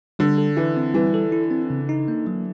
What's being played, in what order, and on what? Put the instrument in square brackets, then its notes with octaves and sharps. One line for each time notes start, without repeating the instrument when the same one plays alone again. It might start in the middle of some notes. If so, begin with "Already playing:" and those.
[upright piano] D3 [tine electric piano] G3
[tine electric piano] A4
[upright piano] E3 [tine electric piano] E4
[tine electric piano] C4
[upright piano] E3 [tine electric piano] G3
[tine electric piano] A4
E4
C4
C#3
D#4
A#3
F#3